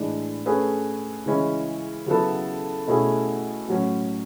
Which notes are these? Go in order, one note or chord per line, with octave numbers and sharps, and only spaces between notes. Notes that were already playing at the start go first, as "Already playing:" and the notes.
Already playing: A2 E3 G#3 D4
A3 C#4 G#4 B4
C#3 E3 G#3 C#4 E4
C#3 F#3 B3 E4 A4
B2 A3 C#4 E4 G#4
A2 F#3 C#4